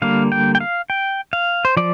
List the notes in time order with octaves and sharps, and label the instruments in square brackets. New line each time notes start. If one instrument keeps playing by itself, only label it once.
[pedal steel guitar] D3 G3 A#3 F5
G5
G5
F5
G5
F5
C5
F3 D5